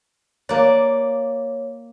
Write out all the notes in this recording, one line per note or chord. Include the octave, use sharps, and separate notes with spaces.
A#3 C#5 D5